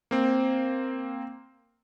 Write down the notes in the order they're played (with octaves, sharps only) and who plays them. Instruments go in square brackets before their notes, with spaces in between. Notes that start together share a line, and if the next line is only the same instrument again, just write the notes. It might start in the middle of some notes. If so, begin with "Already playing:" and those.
[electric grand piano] A#3 C4